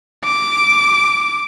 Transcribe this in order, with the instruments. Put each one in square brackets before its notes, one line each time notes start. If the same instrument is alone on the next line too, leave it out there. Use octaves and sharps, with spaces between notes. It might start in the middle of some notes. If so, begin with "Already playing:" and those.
[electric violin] D6